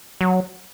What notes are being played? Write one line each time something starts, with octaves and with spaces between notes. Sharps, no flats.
F#3